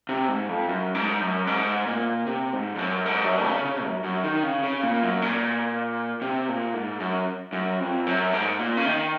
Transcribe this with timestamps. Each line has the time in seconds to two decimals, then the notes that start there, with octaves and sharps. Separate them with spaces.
0.09 C3
0.28 G#2
0.49 F2
0.69 F#2
0.95 G#2
1.21 F#2
1.47 G#2
1.87 A#2
2.27 C3
2.53 G#2
2.75 F2
2.79 F#2
3.06 G#2
3.24 F#2
3.45 C#3
3.65 C#3
3.84 F#2
4.04 F#2
4.24 D#3
4.43 C#3
4.64 C#3
4.83 A#2
5.03 F#2
5.22 A#2
6.22 C3
6.48 A#2
6.74 G#2
7.00 F#2
7.53 F#2
7.80 F2
8.07 F#2
8.33 G#2
8.59 A#2
8.77 C#3
8.86 D#3